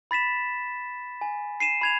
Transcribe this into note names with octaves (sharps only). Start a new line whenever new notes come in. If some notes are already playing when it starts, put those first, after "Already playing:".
B5 A6 B6 E7
G#5
C7 D#7 E7
B5 G#6 F7